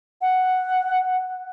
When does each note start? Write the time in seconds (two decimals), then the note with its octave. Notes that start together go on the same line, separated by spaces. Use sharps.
0.22 F#5